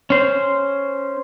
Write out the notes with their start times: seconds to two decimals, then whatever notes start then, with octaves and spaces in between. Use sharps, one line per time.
0.10 C#4 C5